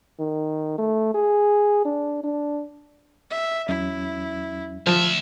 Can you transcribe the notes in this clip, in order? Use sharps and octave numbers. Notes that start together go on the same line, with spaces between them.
D#3
A3
G#4
D4
D4
E5
E2 F#3 C#4 E4
D2 F3 E5